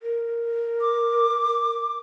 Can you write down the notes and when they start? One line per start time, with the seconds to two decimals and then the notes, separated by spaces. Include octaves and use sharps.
0.03 A#4
0.81 D6